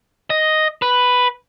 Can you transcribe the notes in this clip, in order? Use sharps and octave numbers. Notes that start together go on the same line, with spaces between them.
D#5
B4